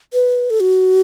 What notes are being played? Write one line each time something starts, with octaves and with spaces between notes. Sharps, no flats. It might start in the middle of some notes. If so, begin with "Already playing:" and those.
B4
A4
F#4